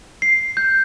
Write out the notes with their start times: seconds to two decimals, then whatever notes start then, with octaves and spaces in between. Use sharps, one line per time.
0.22 C7
0.57 G6